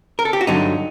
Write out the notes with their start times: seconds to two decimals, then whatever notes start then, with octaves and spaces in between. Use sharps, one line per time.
0.19 A#4
0.25 A4
0.33 G4
0.41 F#4
0.47 G2 D3 F#3 D#4